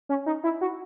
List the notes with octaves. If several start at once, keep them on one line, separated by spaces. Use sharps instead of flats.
C#4
D#4
E4
F#4